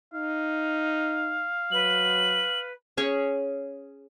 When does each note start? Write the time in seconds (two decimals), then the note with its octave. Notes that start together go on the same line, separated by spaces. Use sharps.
0.14 D#4 F5
1.72 F#3 B4 F#7
2.97 C#4 G#4 C#5